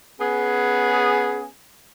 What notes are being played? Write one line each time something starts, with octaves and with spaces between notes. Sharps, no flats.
B3 C#4 G#4